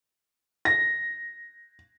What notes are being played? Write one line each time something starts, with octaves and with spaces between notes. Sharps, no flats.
A#6